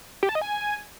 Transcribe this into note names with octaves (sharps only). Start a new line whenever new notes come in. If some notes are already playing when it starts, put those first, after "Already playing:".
G4
A5
D#5
G#5